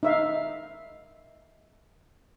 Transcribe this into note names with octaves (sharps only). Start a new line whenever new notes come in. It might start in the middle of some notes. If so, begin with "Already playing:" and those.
D#4 E5 F5